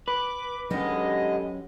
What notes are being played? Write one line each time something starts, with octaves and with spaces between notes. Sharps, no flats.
B4 D6
D3 D#3 F#3 G#3 B3 C#4 G4 D#5